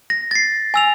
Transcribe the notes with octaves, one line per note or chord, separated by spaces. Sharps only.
A#6
A6 C7
G#5 E6 F7